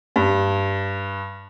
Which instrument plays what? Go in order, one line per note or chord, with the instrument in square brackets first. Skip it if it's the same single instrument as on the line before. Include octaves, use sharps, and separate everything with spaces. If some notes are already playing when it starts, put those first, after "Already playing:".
[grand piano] G2